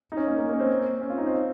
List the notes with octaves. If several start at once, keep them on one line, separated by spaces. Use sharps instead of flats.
D#4
C#4
A#3
A#3
A#3 C#4
C4
C#4
F4
D#4
C4